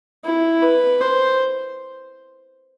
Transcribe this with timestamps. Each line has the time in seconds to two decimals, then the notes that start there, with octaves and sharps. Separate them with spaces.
0.25 E4
0.63 B4
1.01 C5